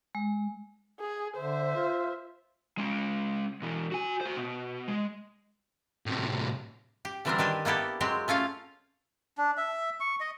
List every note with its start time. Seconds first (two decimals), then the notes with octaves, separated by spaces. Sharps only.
0.15 G#3
1.00 G#4
1.37 D3 C5 E5
1.76 F4
2.78 G#3 C#4
3.62 B2 E3
3.92 F#4 G#5
4.21 F#4 C5
4.37 B2
4.88 G#3
6.06 A2 C3
7.05 G4
7.25 D3 E3 G3 C4 D4 A#4
7.38 D#3 D4 G4 G#5
7.65 A#3 B3 E4 G4 A4
8.00 F#3 G#3 C4 G4
8.28 A3 C#4 F4 F5
9.38 D4
9.57 E5
10.00 C#6
10.20 D#5